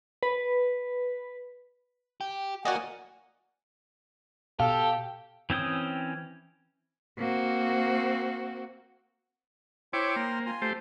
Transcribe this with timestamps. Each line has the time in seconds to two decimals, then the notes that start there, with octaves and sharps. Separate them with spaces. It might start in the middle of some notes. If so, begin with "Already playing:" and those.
0.23 B4
2.21 G4
2.65 A#3 F#4 D5 D#5 F#5 G#5
4.60 B2 G4 A4 F5
5.50 E3 C4 C#4 G5 D#6
7.17 A#3 C4 F#4
9.93 E4 C5 C#5 G5 C6 D6
10.16 A#3
10.46 F4 G#5 C6
10.62 A3 G4 C5